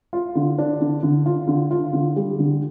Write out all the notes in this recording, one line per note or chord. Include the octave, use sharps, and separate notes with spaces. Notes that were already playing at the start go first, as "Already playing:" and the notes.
F4
D3
D4
D3
D3
F4
D3
F4
D3
G3
D3